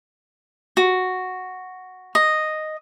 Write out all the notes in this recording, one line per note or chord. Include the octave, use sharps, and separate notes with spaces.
F#4
D#5